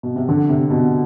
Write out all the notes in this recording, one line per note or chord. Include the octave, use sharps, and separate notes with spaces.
B2
C3
D3
C3
B2